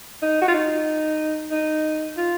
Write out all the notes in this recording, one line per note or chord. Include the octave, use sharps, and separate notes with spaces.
D#4
F#4
F4
D#4
D#4
F4